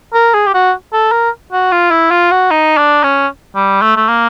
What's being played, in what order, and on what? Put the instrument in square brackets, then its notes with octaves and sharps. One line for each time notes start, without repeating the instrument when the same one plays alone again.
[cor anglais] A#4
G#4
G4
F#4
A4
A#4
F#4
F4
E4
F4
F#4
D#4
D4
C#4
G3
A3
A3
A#3